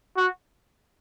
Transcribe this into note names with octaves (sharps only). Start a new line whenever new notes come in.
F#4